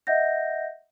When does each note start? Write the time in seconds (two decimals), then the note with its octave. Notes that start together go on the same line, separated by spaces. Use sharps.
0.07 D#5 E5 F#5 G6 A#6